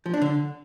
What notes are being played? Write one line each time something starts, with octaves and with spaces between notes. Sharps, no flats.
F3
D4
D3